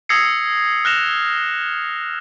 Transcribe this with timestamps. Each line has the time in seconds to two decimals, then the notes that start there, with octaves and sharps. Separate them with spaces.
0.09 D#6 E6 G#6 A#6 C7 C#7
0.85 F6 F#6 A#6 C#7 E7 F7